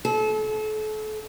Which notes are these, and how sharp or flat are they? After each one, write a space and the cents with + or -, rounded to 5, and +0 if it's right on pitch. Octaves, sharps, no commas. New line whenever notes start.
A4 -35